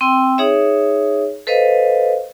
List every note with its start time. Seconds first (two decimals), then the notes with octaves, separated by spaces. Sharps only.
0.01 C4 G5 C6 E6
0.38 D#4 G#4 C#5 E5
1.47 A4 B4 C5 D#5 F5